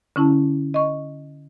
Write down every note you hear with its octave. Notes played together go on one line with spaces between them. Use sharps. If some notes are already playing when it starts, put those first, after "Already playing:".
D3 C#4 E4 A5
D#5 C#6